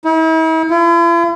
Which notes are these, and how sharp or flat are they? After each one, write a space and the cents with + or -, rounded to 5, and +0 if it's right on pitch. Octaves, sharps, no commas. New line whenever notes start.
E4 -45
E4 +45